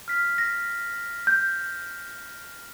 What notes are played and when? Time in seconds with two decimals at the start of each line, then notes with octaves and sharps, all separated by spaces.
0.08 F6 B6
0.38 A#6
1.27 G6